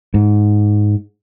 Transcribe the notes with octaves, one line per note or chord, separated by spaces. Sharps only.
G#2